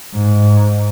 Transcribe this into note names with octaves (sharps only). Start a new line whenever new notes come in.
G#2